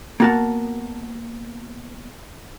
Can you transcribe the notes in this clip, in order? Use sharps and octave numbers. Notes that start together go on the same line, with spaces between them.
A#3 B3 F#4 A#4 F#5 A5